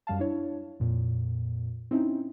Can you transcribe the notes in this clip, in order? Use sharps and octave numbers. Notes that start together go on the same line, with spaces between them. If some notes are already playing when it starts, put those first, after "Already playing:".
F#2 G3 F5 A5
D4 E4 C#5
F2 A#2
C4 C#4 D#4 E4